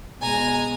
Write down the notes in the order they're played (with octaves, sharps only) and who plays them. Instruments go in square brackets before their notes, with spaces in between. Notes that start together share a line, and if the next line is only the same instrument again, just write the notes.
[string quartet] B2 G#3 G#5 A#5